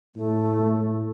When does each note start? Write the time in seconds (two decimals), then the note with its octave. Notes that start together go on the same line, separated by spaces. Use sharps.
0.16 A2 A3
0.59 A2